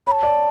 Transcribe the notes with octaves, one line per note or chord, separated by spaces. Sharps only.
C#5 A5 B5
D5